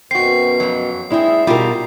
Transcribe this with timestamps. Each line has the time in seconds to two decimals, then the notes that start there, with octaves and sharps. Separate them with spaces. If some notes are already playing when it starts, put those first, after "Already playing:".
0.11 F#2 B2 C4 F#4 C7
0.60 F2 F#3
1.10 G#3 C4 D4 E4 G#4 E5
1.47 B2 G3 D#4 F4 G4 A#4